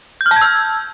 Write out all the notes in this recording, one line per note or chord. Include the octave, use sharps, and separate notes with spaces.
G6
F6
A5
G#6
E6